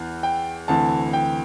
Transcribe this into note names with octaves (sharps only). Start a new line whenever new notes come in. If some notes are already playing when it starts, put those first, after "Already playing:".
Already playing: E2 E3
G5
D2 C3 E3 A5
G5